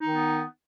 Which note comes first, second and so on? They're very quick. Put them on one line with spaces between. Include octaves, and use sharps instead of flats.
D#4 D#3 B3